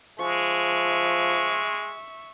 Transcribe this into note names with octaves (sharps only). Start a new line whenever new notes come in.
F3 G#3 E5 C#6